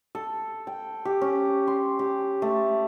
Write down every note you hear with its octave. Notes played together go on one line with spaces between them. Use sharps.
A4
G5
G4
C#4
C6
G4
A3